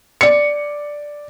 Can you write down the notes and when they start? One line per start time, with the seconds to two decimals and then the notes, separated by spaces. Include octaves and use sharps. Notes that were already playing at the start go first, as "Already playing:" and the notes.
0.21 D5 C#7